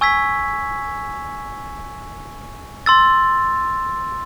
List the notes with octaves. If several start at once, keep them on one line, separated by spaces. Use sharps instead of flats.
G#5 C#6 E6 G#6 B6
C6 E6 A6